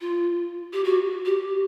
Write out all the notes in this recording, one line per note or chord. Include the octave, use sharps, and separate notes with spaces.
F4
G4
F#4
G4